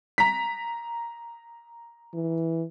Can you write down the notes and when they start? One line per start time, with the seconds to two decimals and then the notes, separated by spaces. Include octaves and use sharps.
0.18 A#5 B6
2.14 E3